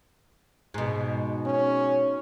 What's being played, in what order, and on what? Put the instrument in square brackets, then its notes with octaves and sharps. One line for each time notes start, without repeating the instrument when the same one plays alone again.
[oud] G#2 B2
[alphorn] C#4